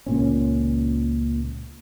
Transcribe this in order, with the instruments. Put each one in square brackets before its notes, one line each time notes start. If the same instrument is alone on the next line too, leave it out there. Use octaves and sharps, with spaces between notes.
[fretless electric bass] C#2 A#2 C#4